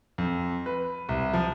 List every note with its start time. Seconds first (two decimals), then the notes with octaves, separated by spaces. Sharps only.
0.18 F2
0.66 B4
1.09 C2
1.33 F3